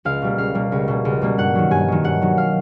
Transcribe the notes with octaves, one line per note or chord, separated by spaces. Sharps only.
C#2 F5
B2 G3 A#3
C#2 F5
B2 G3 A#3
C#2
B2 G3 A#3
C#2
B2 G3 A#3
G2 F#5
D#3 F#3
G2 G#5
D#3 F#3
G2 F#5
D#3 F#3
F5